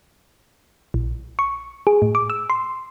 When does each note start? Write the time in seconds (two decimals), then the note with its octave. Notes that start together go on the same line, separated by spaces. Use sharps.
0.94 A#1
1.39 C#6
1.87 G#4
2.02 A2
2.15 D6
2.30 E6
2.50 C6